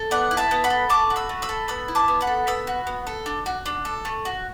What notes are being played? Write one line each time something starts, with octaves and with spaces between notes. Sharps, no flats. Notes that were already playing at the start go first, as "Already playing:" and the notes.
Already playing: A4
B3 D5 F#5
E4
E5 A5
B3
F#5 B5
A4
A3 A5 D6
F#4
B5 E6
A3
B5 E6
A4
B3 B5 E6
E4
A5 D6
B3
F#5 B5
A4
B3 B5 E6
F#4
B3
A4
D4
F#4
D4
A4
A3
F#4